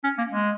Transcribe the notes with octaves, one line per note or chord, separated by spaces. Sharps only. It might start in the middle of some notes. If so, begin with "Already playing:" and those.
C#4
A#3
G#3